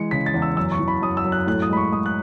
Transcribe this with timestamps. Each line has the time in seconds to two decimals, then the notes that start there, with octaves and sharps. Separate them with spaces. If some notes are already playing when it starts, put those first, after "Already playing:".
Already playing: E3 G#3 C#7
0.11 C#3 B6
0.26 A6
0.34 E2
0.42 E6
0.57 F#2 E6
0.72 C#6
0.79 E3
0.88 B5
1.02 F#2 D#6
1.17 E6
1.25 F#2
1.32 F#6
1.47 A2 F#6
1.62 D#6
1.70 G#3 B5
1.77 C#6
1.92 G#3 D#6
2.06 F#6